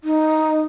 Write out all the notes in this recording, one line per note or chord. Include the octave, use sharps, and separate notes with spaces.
D#4